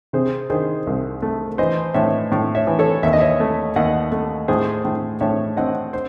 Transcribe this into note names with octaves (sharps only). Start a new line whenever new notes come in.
C3 G#4 C5
D#3 G#4 C5
C2
A3
E3 C5 D#5
A2 C#5 E5
A2
C#5 E5
E3
A4 C#5
D#2 E5
D#5
C#5 E5
A3
D#2 D#5 F#5
A3
A2 G#4 C5
A2
A2 C#5 E5
C4 D#5 F#5
C5